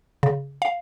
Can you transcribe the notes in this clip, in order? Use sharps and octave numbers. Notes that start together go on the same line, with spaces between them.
C#3
F5